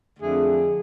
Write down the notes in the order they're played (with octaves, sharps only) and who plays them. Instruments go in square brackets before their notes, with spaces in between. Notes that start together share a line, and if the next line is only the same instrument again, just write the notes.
[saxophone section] F2 D3 A3 G#4